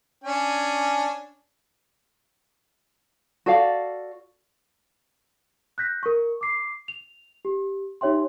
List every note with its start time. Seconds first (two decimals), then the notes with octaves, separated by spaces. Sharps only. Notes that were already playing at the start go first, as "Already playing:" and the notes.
0.24 C#4 D4 G#5
3.46 F#4 A4 D5 F5
5.78 F#6 G6 A#6 B6
6.03 A#4 C#6
6.41 D6 C7
6.88 F7
7.45 G4
8.01 D#4 G4 C#5 E5 G5 C6